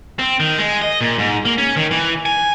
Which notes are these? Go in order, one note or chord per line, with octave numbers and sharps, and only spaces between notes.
C4
D#3
G#3
D#5
A#2
G#2
A#3
C#4
D#3
E3
G#5